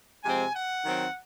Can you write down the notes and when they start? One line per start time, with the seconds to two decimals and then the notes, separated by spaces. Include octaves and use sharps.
0.23 C3 F3 G#3 C4 G#5
0.54 F#5
0.83 D#3 F#3 C4